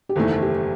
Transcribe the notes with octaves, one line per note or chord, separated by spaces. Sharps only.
G4
F#1 E2 D#3 A3 A4
G4